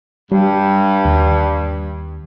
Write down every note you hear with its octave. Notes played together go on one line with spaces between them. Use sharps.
G2 G3
D#2